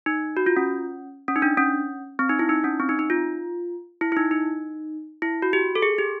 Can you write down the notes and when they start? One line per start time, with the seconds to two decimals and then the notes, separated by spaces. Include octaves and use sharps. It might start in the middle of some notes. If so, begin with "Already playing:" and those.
0.06 D#4
0.37 F#4
0.46 F4
0.57 C#4
1.28 C#4
1.36 D#4
1.42 D4
1.58 C#4
2.19 C4
2.29 D#4
2.39 E4
2.49 D#4
2.64 C#4
2.80 C4
2.89 D#4
2.99 D#4
3.10 F4
4.01 E4
4.12 E4
4.17 D#4
4.31 D#4
5.22 E4
5.42 F#4
5.53 G4
5.75 A4
5.82 G#4
5.98 G4